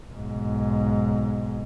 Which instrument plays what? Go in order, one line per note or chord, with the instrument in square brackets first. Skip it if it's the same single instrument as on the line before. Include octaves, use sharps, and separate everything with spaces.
[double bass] B1 G#2